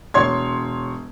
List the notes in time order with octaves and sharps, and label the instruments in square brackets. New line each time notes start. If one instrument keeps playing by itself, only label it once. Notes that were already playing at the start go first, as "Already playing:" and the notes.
[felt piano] E1 C#5 C6 G#6